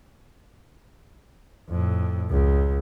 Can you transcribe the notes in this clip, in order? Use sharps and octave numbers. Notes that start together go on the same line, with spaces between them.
F2 A2
C#2